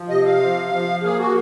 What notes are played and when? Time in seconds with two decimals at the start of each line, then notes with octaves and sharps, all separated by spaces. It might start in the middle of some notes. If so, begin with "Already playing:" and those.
Already playing: F3
0.09 C3 D#5
0.25 F5
0.41 F3
0.72 F3
1.03 A#3 G#4
1.19 F#4